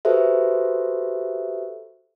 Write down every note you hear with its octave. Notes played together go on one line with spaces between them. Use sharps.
F#4 G4 A4 B4 C5 E5